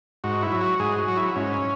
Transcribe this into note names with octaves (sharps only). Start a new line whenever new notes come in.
G#2 F#4
E4
F#3
F#4
G#2 G#4
F#4
F#3
E4
G#2 C#4